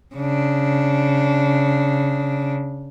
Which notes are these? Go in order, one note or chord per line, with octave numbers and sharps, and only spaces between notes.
C#3 D4